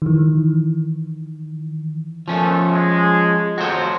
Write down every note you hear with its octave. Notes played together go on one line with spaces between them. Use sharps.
D#3 E3
A#2 F3 A3 C#4
G#3
F2 F3 F#3 F#4 C5